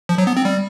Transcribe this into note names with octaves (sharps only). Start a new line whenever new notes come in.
F3
F#3
B3
C4
G3